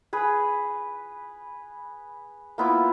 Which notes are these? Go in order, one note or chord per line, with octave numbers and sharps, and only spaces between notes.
G#4 B4
A#3 B3 E4 F4